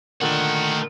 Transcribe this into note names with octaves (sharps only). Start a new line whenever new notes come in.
A#2 D3 D#3 A3 F#5